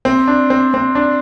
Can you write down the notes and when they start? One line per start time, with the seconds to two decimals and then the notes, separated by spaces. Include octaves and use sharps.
0.05 C4
0.28 D4
0.50 C4
0.74 C4
0.95 D4